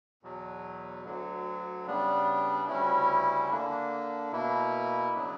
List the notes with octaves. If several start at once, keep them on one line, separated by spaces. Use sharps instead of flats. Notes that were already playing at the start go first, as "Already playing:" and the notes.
E2 B2 F#3
D2 D3 F#3
C#3 G3 B3 D4
D2 C#3 G3 C#4 E4
D3 A#3 D4
B2 A#3 E4
C#3 F#3 B3 D4